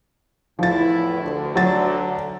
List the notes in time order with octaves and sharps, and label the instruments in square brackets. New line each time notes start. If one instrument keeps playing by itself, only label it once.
[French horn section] E2 A2 E4 [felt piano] F3 A6
[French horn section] D2 D3
[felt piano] F#3 A6